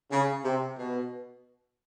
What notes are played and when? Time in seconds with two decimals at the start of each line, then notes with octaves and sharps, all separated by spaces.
0.11 C#3
0.45 C3
0.78 B2